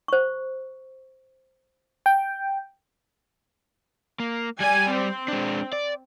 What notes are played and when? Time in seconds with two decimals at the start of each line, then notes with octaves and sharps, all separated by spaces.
0.08 C5 C#6
2.06 G5
4.20 A#3
4.60 G3 D5 G#5
4.91 C4
5.28 G#3 D4
5.73 D5